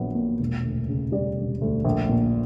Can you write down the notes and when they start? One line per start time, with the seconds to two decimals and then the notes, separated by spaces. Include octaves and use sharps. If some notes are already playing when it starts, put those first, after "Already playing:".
Already playing: A#1 F#3 B3
0.15 A#2
0.39 E1
0.64 D2
0.89 C#3
1.12 G3 D5
1.37 E1
1.61 D2
1.85 A#1
2.09 A#2